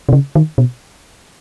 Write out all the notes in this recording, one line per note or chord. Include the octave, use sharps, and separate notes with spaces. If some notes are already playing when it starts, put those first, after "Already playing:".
C3
C#3
D#3
B2